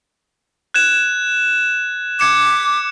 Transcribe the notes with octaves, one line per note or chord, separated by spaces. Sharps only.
F#6 G#6 E7
D6 G#6 C#7 E7